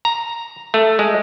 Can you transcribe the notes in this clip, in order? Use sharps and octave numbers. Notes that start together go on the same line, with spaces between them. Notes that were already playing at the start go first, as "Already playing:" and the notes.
A#5
A3
G#3